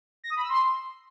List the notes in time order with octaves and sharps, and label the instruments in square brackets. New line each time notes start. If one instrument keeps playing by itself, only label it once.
[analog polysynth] A#6
D#6
B5
E6
C6